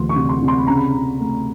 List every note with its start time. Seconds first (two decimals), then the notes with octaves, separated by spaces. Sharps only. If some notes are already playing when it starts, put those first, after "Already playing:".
Already playing: D2 E3 C6
0.09 C#6
0.16 C3
0.29 C6
0.42 C3
0.48 C6
0.58 B5
0.67 C#3 A#5
0.77 B5
0.94 C#3
1.20 A3